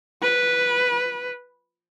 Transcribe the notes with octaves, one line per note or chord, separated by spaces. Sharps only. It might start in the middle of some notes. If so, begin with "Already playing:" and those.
B4